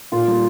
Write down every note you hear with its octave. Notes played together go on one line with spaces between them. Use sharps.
A#2 F4
G3 A#3